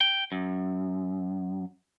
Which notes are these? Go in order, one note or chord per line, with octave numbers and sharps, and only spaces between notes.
G5
F#2